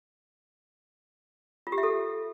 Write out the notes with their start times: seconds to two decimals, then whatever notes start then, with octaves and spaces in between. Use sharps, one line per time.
1.67 F4
1.72 G4
1.78 E5
1.83 A4